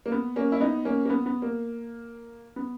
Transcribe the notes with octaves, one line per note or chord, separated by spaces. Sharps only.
A#3
B3
A#3 C#4
E4
B3 D#4
A#3 C#4
A#3
B3
B3
A#3
B3